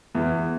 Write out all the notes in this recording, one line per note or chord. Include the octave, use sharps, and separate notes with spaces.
E2